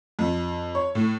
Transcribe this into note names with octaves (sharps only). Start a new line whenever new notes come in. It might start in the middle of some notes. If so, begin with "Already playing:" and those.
F2
C#5
A2